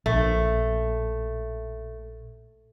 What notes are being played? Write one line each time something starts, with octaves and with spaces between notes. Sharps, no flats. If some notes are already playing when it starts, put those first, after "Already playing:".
A#1 A3